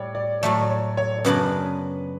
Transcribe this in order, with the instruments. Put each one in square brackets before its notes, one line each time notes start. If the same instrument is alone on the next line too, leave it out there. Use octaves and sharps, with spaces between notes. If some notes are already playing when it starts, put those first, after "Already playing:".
Already playing: [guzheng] A2 G3 [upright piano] C#5 D5
[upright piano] D5
[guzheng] A2 F#3 A3 [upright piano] D5
[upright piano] D5
C#5
C#5
C#5
[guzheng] F#2 C#3 F#3 B3 D4 [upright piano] B4